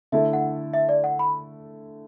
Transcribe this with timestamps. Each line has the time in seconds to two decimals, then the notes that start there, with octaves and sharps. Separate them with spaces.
0.12 D3 A3 E4 A4 E5
0.33 F#5
0.74 E5
0.89 D5
1.04 F#5
1.19 B5